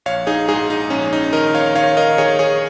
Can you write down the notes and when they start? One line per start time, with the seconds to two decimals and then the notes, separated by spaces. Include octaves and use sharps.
0.06 A#1 C#5 F5
0.27 D#4 G#4
0.48 G#2 D#4 G#4
0.70 D#4
0.90 A#1 C#4
1.13 D#4
1.33 D#3 A#4 D#5
1.55 C#5 F5
1.75 D#3 C#5 F5
1.97 A#4 D#5
2.18 D#3 G#4 C#5
2.39 G#4 C#5